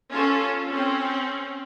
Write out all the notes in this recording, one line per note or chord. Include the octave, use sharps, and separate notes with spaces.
C#4 F4 A4
C4 C#4